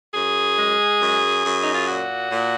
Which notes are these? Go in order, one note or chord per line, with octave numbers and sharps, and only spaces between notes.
F#2 G#4
G#3
F#2
F#2
D#4
F4
A#2 F#4
A#2